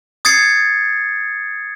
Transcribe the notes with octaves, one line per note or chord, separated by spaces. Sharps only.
D#6 G#6 A6 C7 C#7